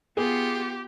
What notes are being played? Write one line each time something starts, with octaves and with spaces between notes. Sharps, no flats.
B3 F4 G4 G#4